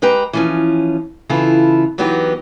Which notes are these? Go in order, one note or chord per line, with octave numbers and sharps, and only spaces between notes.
G#3 G4 B4 G5 A#5
E3 F3 C#4
C#3 E3 E4 F4 A4
E3 F#3 B3 D#4 G4